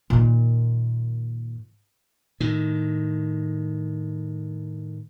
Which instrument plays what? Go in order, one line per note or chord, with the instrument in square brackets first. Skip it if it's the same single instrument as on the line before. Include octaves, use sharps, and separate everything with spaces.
[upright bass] A#2 D#3
[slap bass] A2 D#3